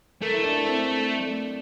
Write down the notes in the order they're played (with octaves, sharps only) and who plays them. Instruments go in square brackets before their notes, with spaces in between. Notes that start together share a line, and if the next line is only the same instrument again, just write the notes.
[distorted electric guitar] A3 [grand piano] A#4
[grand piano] E4
D4
C4